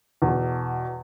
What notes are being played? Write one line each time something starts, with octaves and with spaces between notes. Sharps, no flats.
E2 B2